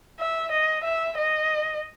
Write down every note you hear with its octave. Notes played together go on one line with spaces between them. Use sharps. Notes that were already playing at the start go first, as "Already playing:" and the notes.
E5
D#5
E5
D#5